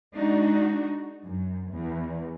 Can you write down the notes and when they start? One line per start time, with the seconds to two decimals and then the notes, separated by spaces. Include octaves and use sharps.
0.15 G#3 D4 D#4 F#4
1.25 F#2
1.73 E2